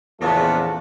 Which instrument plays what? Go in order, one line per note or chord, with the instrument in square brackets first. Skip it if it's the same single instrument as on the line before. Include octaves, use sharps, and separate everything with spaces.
[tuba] E2 [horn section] A#2 C#3 B3 [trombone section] F3 A3 D4 [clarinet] A5